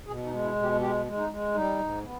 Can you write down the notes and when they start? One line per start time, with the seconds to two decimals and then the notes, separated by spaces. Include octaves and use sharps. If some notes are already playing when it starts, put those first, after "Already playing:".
0.07 B2 G#4
0.25 D#4
0.31 G#3
0.43 E4
0.56 B2
0.62 G4
0.80 G#3 G4
1.05 G#3
1.17 D#4
1.29 G#3
1.54 G3 D#4
1.79 G#2
2.03 B3